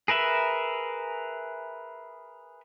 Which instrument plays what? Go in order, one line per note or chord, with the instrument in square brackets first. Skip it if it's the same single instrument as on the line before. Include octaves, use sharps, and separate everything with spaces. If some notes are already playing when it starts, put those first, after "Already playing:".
[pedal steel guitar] G#4 A#4 B4 E5